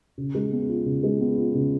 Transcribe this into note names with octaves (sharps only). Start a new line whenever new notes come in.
C#3
G#3
B3
F4
C#3
G#3
B3
F4
C#3